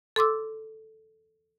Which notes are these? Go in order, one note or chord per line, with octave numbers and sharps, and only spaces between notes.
A4 C6 D6 E6